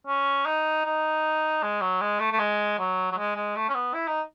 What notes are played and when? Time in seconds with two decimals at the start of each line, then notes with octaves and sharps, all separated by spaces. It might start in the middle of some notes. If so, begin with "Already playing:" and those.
0.07 C#4
0.46 D#4
0.85 D#4
1.62 G#3
1.81 F#3
2.01 G#3
2.20 A3
2.32 A3
2.39 G#3
2.79 F#3
3.12 F#3
3.17 G#3
3.36 G#3
3.56 A3
3.69 C#4
3.74 B3
3.94 E4
4.08 D#4